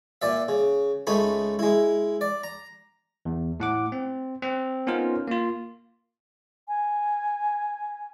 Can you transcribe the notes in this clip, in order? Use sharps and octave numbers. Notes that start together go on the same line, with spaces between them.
A#2 D5 E5
C#3
C#2 A3 D#4 B5
G#3 E4
D5
A#5
E2
A2 F#5 D6
C4
C4
B3 C#4 D#4 F4 A#4 C5
A#3 F4
G#5